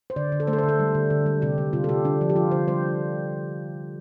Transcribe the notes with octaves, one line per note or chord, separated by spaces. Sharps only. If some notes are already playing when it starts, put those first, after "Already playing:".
C5
D3 D5
D3
A4
A3 C5
A4
C5
D3
A4
G3
D3
D3
G3
C3 G4
G3
C3 F4
A4
C3 G4
D3 D4
F3
G4
F3 F4
D3 C5
G3 C5